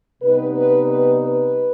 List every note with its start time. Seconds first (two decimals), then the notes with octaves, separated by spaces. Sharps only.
0.22 C3 G3 B3 D#4 B4
0.55 B4
0.88 B4
1.21 B4